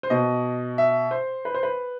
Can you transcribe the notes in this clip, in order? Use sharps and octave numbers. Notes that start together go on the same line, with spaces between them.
C5
B2 D#5
E5
C5
B4
C5
B4